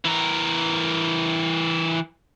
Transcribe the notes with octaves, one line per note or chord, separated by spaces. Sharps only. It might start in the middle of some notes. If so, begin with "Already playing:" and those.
E3 A#4